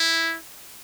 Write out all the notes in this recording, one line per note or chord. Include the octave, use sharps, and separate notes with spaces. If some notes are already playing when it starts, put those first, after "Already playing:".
Already playing: E4